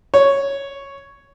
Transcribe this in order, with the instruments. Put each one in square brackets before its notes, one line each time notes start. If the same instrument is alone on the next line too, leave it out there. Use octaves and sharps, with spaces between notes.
[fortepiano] C#5